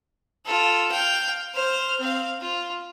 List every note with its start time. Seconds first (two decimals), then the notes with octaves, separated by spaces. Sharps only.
0.46 F4 A4
0.92 F5 G5
1.54 C5 F6
2.00 C4 F5
2.41 F4